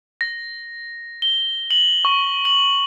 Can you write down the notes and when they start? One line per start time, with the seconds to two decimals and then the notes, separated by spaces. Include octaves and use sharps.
0.21 A#6
1.22 G7
1.71 F#7
2.05 C#6
2.45 F#7